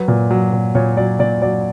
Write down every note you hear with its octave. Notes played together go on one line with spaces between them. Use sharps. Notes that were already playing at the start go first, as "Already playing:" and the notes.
Already playing: F#3 B4
A#2
F#3
A#2
A#2 C#5
F#3 D5
A#2 D5
F#3 D5